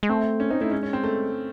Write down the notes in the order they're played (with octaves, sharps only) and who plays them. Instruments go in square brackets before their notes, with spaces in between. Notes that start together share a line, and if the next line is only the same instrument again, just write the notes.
[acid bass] G#3
[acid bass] A3 [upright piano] C4
[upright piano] C#4
[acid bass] C4 [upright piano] D#4
[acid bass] A3 [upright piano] E4
[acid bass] G#3 [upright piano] C#4
[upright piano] C#4
C4
A3